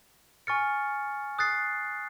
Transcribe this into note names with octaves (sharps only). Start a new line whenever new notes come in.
G#5 C#6 F6 A6 C#7
D#6 F#6 A6 C7